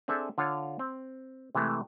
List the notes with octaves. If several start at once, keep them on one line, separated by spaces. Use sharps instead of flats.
C4 D4 G#4 A4 E5
D3 F4 C#5 F5
C4
C3 E3 G#3 A3